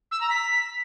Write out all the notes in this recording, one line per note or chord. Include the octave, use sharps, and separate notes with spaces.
E6
A#5
B6